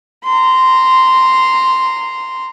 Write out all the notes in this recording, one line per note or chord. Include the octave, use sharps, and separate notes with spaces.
A#5 C6